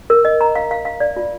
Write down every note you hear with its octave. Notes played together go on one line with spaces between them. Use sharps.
A#4
D#5
A#5
F5
F5
F5
D5
F4